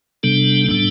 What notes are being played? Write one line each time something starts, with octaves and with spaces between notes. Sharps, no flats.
C3 G3 B3 D4 A4
A2 G3 B3 D4